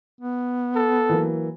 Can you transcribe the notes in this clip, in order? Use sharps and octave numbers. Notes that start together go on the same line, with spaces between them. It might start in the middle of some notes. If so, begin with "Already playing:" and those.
B3
A4
E3 F#3 A#3